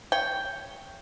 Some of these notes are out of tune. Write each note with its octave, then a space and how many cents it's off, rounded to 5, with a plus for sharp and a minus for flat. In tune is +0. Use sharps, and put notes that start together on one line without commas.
C#5 +0 G5 +0